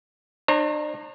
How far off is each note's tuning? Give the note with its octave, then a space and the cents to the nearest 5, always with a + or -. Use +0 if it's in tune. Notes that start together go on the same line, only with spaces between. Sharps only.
D4 +40 C#5 -45 A#5 +0